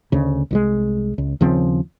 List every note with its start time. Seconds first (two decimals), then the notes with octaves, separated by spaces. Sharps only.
0.12 D2 C#3
0.51 C2 E3 G#3
1.18 C#2
1.41 D#2 C#3 F3 C4